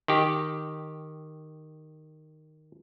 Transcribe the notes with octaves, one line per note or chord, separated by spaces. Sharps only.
D#3 G4